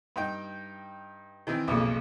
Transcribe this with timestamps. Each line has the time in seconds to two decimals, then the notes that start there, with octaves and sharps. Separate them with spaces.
0.16 G2 D#4 G5
1.47 D#3 E3 C4
1.68 B1 F2 A#2 C#3